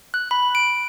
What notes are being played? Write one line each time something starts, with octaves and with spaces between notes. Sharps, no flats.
F#6
B5
D7